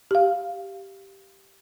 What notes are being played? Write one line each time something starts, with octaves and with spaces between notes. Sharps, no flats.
G4 F5